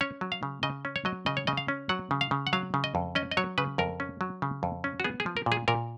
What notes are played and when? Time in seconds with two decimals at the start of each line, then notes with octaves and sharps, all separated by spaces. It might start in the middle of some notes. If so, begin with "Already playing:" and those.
0.01 C#4 C#5
0.21 F#3
0.32 F5
0.43 C#3
0.63 C#3 D#5
0.85 C#4
0.96 C#5
1.05 F#3 D#5
1.26 C#3 D#5
1.37 C#5
1.47 C#3 D#5
1.57 F5
1.68 C#4
1.89 F#3 F#5
2.11 C#3
2.21 F5
2.31 C#3
2.47 F#5
2.53 F#3 F5
2.74 C#3
2.84 D#5
2.95 F2
3.15 C#4 D#5
3.31 D#5
3.37 F#3 C#5
3.58 C#3 B4
3.78 F2 A#4
4.00 C#4
4.21 F#3
4.42 C#3
4.63 F2
4.84 C#4
5.00 F#4
5.04 B3 G#4
5.20 G#4
5.26 F3
5.37 A#4
5.46 A#2
5.52 G#4
5.68 A#2 A#4